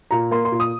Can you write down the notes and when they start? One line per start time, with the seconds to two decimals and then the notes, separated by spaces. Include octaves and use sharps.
0.11 A#2 A#5
0.31 A#3 C6
0.45 C6
0.52 A#2
0.60 D#6